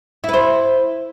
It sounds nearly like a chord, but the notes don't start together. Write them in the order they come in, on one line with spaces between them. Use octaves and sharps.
E4 B4 C5